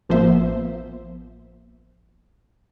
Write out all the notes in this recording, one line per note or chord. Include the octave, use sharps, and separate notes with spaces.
A1 F3 A#3 B3 C5 E5